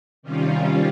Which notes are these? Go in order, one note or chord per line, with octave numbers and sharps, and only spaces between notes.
C3 D#3 G3 C#4 F4